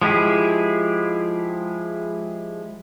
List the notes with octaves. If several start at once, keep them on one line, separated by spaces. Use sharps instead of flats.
F3 G#3 E4 G4 G#4